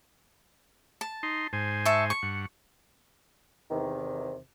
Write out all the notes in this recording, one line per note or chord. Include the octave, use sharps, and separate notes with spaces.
A5
D#4 C6
G#2 C5 G#5
E5 A5 C#6
C#6
G2 F#5
E2 C3 D#3